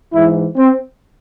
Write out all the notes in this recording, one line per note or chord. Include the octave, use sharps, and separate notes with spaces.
G#2 E3 E4
C4